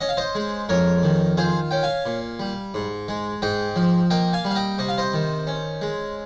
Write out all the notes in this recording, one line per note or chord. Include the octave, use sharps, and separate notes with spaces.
C#4 D#5
F5
C5 D#5
G#3
F2 A#4 C#5
D#3
F4 G#4 C5
C#4 G5
F5 G#5
A#2
G3
G#2
G#3
G#2 D#5 G5
F3
A#3 D#5 G5
F5 G#5
G3
F5
D#5 G5
C3 D#5
F5
C5 D#5
D#3
C#4
G#3